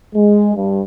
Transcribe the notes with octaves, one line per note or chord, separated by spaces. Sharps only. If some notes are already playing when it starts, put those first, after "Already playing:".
G#3
G2